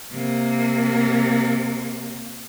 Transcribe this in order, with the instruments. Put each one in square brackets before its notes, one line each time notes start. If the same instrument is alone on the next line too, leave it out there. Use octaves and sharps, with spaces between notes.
[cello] C3 A#3